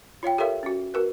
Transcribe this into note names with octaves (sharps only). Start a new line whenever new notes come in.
F4 C#5 F5 G5
G4 A4 A#4 C#5 E5 F5
C#4 F#4
F#4 A#4 B4